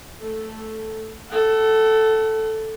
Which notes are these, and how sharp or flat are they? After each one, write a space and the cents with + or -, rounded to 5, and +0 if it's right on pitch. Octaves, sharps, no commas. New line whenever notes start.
A3 +0 A4 -5
A4 +0 F#5 +40